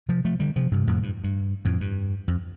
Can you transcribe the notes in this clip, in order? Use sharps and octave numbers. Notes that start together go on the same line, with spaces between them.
C3 F3
F3 A3
D3 G3
C3 F3
G2 C3
F2 A2
G2
G2
F2 A2
G2
F2